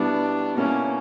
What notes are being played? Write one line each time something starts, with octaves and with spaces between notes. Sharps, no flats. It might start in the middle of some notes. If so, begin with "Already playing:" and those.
Already playing: B2 G3 B3 D4 E4
B2 A#3 C#4 E4